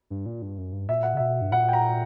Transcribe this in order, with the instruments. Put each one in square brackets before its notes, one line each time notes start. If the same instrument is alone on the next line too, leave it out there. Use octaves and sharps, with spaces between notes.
[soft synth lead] G2
A#2
G2
F#2
G2
[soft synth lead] A#2 [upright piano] E5
[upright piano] F#5
[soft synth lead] C#3
[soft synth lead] B2 [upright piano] E5
[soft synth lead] G2
[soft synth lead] A#2 [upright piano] F#5
[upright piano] G5
A#5